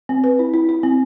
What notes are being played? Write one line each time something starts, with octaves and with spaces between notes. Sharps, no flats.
C4
B4
E4
E4
E4
C4